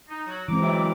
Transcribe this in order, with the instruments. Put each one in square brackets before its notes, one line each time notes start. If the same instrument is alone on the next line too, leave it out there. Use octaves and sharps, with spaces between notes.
[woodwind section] D#4
F#3 F#4
[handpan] E3 G#3 C4 [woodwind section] A#5 D6
[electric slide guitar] F#3 E4